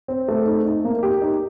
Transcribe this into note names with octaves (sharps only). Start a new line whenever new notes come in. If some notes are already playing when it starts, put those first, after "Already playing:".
C4
A3
D#4
D#4
A#3
G4
D#4